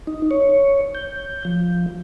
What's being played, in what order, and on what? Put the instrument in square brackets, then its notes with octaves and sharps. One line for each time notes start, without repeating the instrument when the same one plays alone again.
[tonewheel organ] D#4
C#5
G6
F3